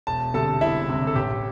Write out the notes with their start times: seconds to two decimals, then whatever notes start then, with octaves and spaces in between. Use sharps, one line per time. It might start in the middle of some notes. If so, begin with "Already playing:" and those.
0.07 E1 A5
0.34 D2 C3 G3 A4 A5
0.61 E1 E4 E5
0.88 D2 C3 G3
1.07 A4
1.15 A1 G4